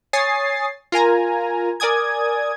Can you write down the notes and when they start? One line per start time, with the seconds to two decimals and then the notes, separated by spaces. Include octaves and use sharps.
0.13 C#5 G#5 D#6 A6 C7
0.92 F4 A#4 G#5 A#5
1.80 A#4 D5 G#5 D#6 G#6